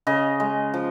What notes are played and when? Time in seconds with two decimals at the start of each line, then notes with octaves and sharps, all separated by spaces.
0.07 C#3 D#5
0.40 G#3
0.74 F3